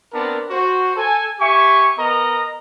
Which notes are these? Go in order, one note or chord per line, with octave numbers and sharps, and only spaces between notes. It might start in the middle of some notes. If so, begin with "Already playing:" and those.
B3 C4 D4 A#4 A5
F#4 C5
A4 G#5
G4 E5 G#5 C#6
B3 A#4 D#5 A#5